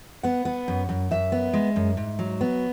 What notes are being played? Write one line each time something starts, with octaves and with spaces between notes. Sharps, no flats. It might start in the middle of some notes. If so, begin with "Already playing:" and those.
B3 F#5
B3
F#2
F#2
F#2 E5
B3
G#3
F#2
G#2
F#3
B3